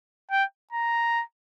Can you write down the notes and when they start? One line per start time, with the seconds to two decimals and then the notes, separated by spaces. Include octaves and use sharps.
0.31 G5
0.73 A#5